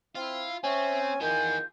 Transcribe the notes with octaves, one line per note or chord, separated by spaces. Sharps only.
C4 E4 F4 F5 F6
C4 C#4 E5 G#5 C#6
D#3 E3 F4 G#4 G6